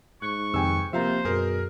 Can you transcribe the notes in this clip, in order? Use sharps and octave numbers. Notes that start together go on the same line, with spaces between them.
G#2 C#6 F#6
F2 C3 D#3 G5 G#5 E6
C3 F3 A#3 C5 E5 F5 A#5
F#2 B2 G#4 A#4